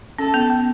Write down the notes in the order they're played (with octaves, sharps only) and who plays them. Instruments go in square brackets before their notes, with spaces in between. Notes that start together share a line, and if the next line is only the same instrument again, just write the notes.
[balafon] C#4 [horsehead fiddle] A4
[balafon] B3
B3